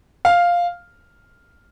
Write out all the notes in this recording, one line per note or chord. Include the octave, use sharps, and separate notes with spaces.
F5